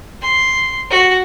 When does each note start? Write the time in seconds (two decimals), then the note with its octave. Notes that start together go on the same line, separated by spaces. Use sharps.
0.22 C6
0.90 F#4